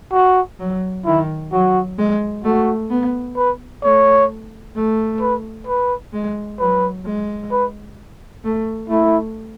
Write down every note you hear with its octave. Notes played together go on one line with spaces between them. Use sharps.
F#4
F#3
D#3 E4
F#3 F#4
G#3
A3 F#4
B3
B4
A3 C#5
A3
B4
B4
G#3
F#3 B4
G#3
B4
A3
A3 E4